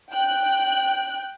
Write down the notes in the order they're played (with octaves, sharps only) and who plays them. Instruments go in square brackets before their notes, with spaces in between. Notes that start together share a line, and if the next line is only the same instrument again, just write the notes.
[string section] G5 F#6